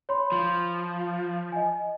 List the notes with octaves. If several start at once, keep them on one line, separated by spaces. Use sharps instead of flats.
C#5 B5 C6
F3
D#5 G#5